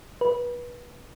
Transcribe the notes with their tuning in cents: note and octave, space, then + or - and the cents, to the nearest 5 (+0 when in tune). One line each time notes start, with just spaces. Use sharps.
B4 -25